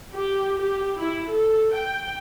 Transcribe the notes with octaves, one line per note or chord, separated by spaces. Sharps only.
G4
G4
E4
A4
G5